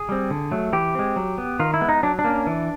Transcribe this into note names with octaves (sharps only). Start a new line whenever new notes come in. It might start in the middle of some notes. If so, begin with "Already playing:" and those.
Already playing: G#4
G3 C4
D3
F#3 A3
E3 G4
G#3 C4
F#3
B3
D#3 F4
E4
G#3 B3
D#4
F#3 D4
D4
A#3 C#4
E3